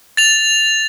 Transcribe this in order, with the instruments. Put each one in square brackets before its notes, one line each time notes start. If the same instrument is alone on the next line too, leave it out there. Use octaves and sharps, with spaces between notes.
[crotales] A6 F7